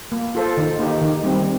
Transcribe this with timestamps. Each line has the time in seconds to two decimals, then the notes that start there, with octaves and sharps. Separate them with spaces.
0.12 A#3
0.35 F4 A4 C5
0.57 D#3
0.79 A#3 D#4 G4
1.01 D#3
1.24 G3 C4